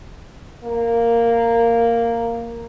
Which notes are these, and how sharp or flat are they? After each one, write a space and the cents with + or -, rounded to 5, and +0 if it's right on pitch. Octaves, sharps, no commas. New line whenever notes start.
A#3 -5